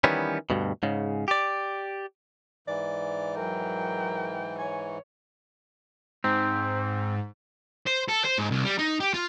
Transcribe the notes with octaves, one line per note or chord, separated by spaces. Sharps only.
D#3 E3 G3 B3 C#4
D2 G2 B2
G#2 C#3
G4 D5
G#2 E3 D5
F#3 A#4 G5
C#5 G#5
G#2 C4
C5
A4
C5
G#2
C2
G3
D#4
G4
F4